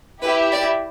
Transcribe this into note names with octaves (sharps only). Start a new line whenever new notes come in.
E4 G4 B4 E5
D5